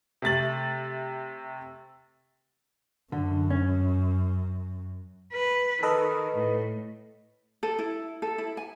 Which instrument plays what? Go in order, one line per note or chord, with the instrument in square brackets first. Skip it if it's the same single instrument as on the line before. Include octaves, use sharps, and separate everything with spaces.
[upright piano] C3 A3 A6 F#7
[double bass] F#2 [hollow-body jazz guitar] D3
[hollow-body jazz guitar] C#4
[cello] B4
[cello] D#3 [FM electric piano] A4 B4 D#5
[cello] A2
[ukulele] A4
E4
A4
E4
G#5